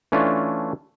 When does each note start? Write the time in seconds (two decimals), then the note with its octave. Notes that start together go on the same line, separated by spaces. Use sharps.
0.12 E3 A3 C#4 D4 F4